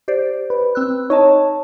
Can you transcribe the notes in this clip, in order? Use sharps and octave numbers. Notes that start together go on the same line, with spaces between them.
G4 C5 D5
B4
C4 E6 F#6
D#4 C#5 D#5 A5